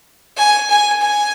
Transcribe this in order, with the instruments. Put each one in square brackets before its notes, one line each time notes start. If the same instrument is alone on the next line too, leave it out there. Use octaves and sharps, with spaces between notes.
[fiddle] G#5
G#5
G#5